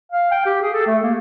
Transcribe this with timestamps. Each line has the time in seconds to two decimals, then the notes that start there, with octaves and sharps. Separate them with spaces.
0.12 F5
0.31 G5
0.46 G4
0.61 G#4
0.73 A4
0.87 A3
1.03 A#3